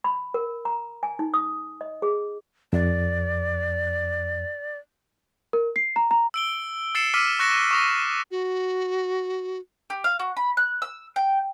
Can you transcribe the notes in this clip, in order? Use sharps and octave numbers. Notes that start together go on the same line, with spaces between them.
B5
A#4
A#5
G#5
D#4
D#6
D#5
G#4
F2 D5
A#4
C7
A#5
A#5
E6 D7 G7
E6 A6 C7 C#7 E7
D6 E6 F6 B6 D#7
C#6 F#6 A#6 C#7 E7
C#6 D#6 A#6
F#4
G4
F5
F#4
B5
F#6
E6
G5